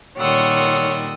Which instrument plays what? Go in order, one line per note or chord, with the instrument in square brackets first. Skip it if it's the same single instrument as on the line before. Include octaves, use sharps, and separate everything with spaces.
[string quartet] A#2 D#3 G3 [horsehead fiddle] C#5 [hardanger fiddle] F#5 C6 [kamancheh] D#6 E6